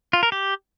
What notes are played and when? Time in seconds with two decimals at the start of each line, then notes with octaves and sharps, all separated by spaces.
0.13 F4
0.23 A#4
0.32 G4